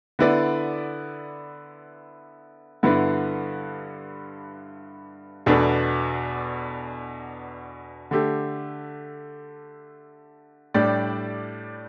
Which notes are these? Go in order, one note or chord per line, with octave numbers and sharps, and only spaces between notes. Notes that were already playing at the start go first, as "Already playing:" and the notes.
D3 B3 E4 B4 D5
G2 D3 B3 E4 B4
E2 B2 A3 D4 B4
D3 A3 G4
A2 G3 D4 G4 D5